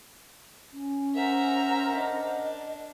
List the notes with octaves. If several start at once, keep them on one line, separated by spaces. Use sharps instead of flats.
C#4
A#4 C5 E5 F#5 A#5
D4 D#5